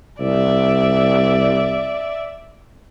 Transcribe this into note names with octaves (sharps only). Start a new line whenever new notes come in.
C2 D5 E5